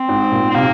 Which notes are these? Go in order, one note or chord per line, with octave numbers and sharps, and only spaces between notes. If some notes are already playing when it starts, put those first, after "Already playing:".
Already playing: C4
G#2
A#2
C4
C3 A#3